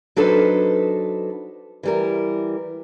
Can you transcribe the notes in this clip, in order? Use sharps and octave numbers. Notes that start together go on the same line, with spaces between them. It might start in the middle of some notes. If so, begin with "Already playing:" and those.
F#3 D4 D#4 A4 B4 C5
E3 G3 A#4